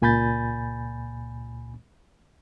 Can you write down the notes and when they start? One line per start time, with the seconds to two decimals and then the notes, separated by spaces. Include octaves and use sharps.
0.02 C#2 A#2 G#5 B5 G6 A6